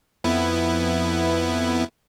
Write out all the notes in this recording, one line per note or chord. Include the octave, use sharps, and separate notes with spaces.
F2 B3 E4